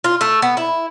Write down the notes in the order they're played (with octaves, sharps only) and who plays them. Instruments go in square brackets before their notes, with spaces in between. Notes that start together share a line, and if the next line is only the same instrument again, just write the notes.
[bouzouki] F4
A3
B3
E4